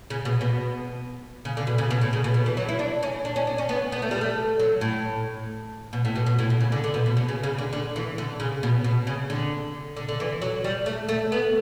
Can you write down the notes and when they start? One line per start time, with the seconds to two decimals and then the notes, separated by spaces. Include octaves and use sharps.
0.10 C#3
0.25 B2
0.41 B2
1.45 C#3
1.57 D3
1.67 B2
1.78 C#3
1.91 B2
2.01 A2
2.13 C#3
2.24 B2
2.34 B2
2.46 E3
2.57 F#3
2.69 E4
2.79 D4
3.03 C#4
3.25 D4
3.36 C#4
3.47 D4
3.58 C#4
3.69 B3
3.92 B3
4.02 A3
4.11 G3
4.21 A3
4.59 F#3
4.81 A2
5.93 B2
6.05 A2
6.16 B2
6.26 B2
6.39 A2
6.50 B2
6.60 C#3
6.72 D3
6.84 D3
6.94 B2
7.06 B2
7.17 B2
7.29 C#3
7.43 C#3
7.58 D3
7.73 D3
7.96 E3
8.18 D3
8.40 C#3
8.63 B2
8.84 B2
9.07 C#3
9.30 D3
9.97 D3
10.09 D3
10.20 E3
10.42 F#3
10.64 G3
10.86 A3
11.09 A3
11.32 B3